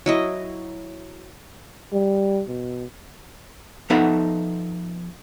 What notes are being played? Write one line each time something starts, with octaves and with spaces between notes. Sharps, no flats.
F#3 E4 D#5
G3
B2
F3 B3 D#4 A4 E5 F#5